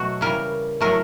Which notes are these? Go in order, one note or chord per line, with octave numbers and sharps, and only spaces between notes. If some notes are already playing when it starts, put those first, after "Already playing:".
Already playing: B2 F#3 A3 F#4
C#3 E3 G3 A#4
A2 F#3 A3 A#4